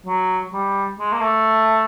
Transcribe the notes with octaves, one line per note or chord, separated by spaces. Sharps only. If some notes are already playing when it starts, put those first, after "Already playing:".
F#3
G3
G#3
A#3
A3